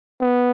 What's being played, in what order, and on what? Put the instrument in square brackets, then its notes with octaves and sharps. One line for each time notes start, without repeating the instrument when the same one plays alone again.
[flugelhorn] B3